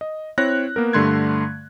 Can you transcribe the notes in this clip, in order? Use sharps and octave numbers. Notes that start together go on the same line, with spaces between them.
D#5
C4 E4 C#5 F#6 A#6
A#3 B3 A#4
G2 D3 A3 C6 F#6 G#6